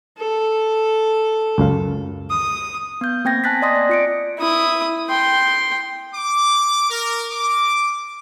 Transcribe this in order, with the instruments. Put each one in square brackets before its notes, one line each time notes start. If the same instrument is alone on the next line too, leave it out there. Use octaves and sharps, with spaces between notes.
[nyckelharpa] A4
[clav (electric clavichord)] C#2 F#2 F5
[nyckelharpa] D#6
[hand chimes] B3 G6
A#3 C4 G5 G#6 A#6
G#5 A5 F#6 A6 B6
D5 D#5 C6 D#6 A#6
D5
F4 C#7 D7
[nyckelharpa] E4 D#6
G5 C6
[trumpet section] D6
A#4
D6